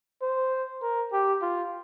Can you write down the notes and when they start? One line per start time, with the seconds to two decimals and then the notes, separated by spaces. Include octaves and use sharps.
0.22 C5
0.82 A#4
1.12 G4
1.42 F4